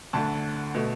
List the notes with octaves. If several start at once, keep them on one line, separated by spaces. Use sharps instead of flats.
D2 D3 A3 A5
B2 A3